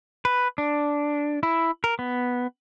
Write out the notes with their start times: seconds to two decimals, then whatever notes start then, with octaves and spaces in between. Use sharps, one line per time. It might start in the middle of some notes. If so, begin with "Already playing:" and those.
0.25 B4
0.58 D4
1.43 E4
1.84 A#4
1.99 B3